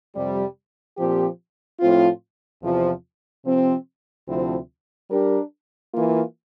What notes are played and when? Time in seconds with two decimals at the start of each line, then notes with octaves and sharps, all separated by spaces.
0.15 F2 C3 G3
0.97 A#2 F3 C4 G4
1.80 A2 F3 C4 F4
2.63 E2 C3 F3
3.45 C3 F3 C4
4.28 D2 C3 F3 C4 E4
5.10 G3 D4 G4 A#4
5.93 E3 A#3 F4